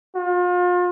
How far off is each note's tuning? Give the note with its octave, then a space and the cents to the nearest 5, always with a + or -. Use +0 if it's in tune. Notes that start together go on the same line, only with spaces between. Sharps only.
F4 +35